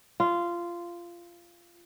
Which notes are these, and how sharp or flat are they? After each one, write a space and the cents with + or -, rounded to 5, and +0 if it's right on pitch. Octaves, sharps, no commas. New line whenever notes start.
F4 -15